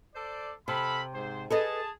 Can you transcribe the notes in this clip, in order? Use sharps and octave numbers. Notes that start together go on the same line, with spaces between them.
A4 C5 D5
C3 A4 F5 B5
G#2 C5
G#4 A4 B4 D#5 A5